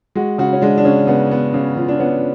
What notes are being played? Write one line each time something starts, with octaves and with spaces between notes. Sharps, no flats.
G#3 F#4
C#3 F#4
C#4
G#3 D4
D4
C#3 C#4
C#3 B3
B3
C#3
C#3 F4
D4
B3 C#4